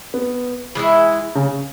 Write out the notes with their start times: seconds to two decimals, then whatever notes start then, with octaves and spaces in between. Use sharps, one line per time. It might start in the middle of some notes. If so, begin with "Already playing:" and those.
0.14 B3
0.75 E3 G#3 E4
1.35 C#3